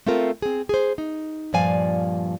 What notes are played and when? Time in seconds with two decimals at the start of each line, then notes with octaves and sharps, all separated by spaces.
0.06 A3 C4 F4 A4 A#4
0.42 C4 G#4
0.69 G#4 C5
0.98 D#4
1.53 G2 A#2 F3 D5 F5 G#5